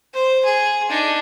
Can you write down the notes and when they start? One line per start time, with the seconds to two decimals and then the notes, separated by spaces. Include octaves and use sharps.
0.14 C5
0.44 G#4
0.89 D4 D#4